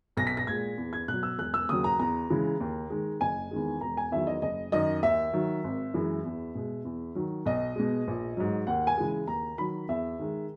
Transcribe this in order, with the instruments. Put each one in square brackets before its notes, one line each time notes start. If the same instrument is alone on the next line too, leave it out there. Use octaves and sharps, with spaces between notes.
[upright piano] B1 A#6
B6
A#6
A#2 G#3 G#6
E2
G#6
B2 F#3 F#6
E6
E1 F#6
E6
D#2 C#3 F#3 D#6
A#5
E2 A#5
C#3 E3 G#3
D#2
D#3 G#3
F#1 G#5
E2 D#3 G#3
E1 A#5
G#5
E2 D#3 F#3 E5
D#5
F#1 D#5
F#2 D#3 D#5
D#2 E5
D#3 F#3
G#1
F#2 E3 G#3
E2
B2 G#3
E2
D#3 F#3
B1 D#5
B2 G#3
A#1
G#2 F#3
D#2 F#5
G#5
C#3 E3 G#3
D#2 A#5
D#3 F#3 B5
E2 E5
D#3 G#3